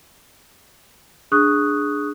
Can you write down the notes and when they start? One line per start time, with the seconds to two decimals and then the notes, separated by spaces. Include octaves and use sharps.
1.32 D4 G#4 C#6 D#6 F#6